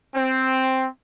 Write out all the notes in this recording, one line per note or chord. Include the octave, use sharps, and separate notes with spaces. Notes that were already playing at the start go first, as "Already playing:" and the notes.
C4